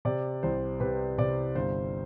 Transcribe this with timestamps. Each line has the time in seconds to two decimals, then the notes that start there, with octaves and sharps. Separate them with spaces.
0.05 C3 D5
0.43 C2 C5
0.80 C3 B4
1.18 C3 D5
1.55 G1 C5